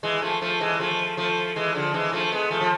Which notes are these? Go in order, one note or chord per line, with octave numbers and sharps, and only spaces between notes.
E3 G#3
F3 A3
F3 A3
E3 G#3
F3 A3
F3 A3
E3 G#3
D3 F3
E3 G#3
F3 A3
G#3 B3
F3 A3
F3